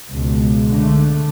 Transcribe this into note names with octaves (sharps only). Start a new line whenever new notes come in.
C#2 B2
D3 A3